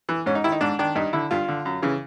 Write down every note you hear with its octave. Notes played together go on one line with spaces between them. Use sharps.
E3
G#2 C#4
D#4
D#3 E4
D#4
G#2 D4
D#3 D4
G2 D#4
D3 E4
G2 F4
D3
F#2
C#3 E3